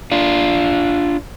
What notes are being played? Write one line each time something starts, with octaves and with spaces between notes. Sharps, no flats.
D4 F4